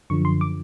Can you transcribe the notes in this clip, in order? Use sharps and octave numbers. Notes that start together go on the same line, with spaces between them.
F#2 D3 F3 C#6
C6
D6